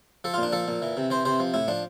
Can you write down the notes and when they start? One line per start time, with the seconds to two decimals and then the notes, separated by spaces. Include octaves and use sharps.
0.24 F3 A4
0.34 F4
0.38 A#2 D4
0.52 F3 A4
0.68 A#2
0.82 E3
0.97 C3
1.10 E3 C5
1.25 C3 C5
1.40 F3
1.54 A2 E4
1.68 F3 D4